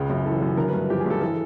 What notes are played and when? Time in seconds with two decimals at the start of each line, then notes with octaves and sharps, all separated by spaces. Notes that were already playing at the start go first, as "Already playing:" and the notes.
Already playing: C#2 C#3
0.10 F#2
0.26 E3 A4
0.42 F#2
0.57 D3 A#4
0.68 B4
0.73 G2
0.90 F3 G4
1.00 G#4
1.06 G2 A4
1.21 E3 A4